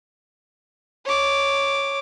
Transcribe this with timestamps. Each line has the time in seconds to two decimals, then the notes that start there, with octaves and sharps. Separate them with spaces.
1.05 C#5 D6